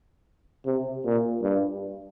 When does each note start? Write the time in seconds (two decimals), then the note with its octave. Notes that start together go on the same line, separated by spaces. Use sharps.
0.66 C3
1.05 A#2
1.43 G2